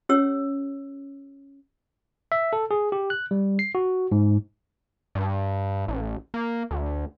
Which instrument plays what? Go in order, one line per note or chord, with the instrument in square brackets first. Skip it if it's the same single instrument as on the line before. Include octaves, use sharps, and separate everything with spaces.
[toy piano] C#4 G4 C#5 E6
[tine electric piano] E5
A4
G#4
G4
F#6
G3
C7
F#4
G#2
[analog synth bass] G2
A1
A#3
D2